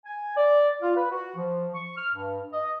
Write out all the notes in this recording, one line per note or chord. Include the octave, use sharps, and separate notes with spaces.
G#5
D5
F4
B4
F#4
F3
C#6
F6
G2
D#5